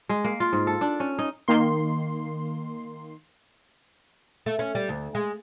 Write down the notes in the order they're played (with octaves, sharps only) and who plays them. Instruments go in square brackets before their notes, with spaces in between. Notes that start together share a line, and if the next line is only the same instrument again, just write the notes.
[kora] G#3
A#3
F4
G#2
A4
D4
C#4
D#4
[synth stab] D#3 A#3 C6
[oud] A3
C#4
G3
D2
G#3